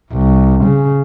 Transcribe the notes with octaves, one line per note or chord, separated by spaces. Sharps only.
C2
C#3